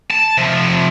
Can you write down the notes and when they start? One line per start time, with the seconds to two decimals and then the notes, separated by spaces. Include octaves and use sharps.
0.10 A5
0.37 C3 F3